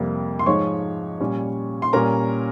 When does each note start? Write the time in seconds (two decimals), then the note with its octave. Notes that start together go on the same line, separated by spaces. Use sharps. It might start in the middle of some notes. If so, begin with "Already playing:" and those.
Already playing: F2 C3 G3 A#3
0.39 C6
0.46 G#2 F3 G#3 D#4 C#5 C#6
1.20 A#2 G3 C#4
1.82 C6
1.93 A#2 G3 C#4 A#4 A#5